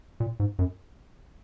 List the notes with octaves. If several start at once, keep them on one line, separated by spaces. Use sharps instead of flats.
A#2
G#2
F#2